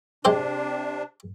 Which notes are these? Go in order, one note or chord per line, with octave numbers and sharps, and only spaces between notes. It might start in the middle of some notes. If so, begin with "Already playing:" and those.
C3 G#3 D4 G4 C5